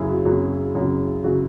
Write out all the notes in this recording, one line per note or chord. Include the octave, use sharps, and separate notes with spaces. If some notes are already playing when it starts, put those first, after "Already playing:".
Already playing: F#2 C#3 F#3 E4 G#4
F#4
F#2 C#3 F#3 F#4
F#2 C#3 F#3
C#3 F#3 F#4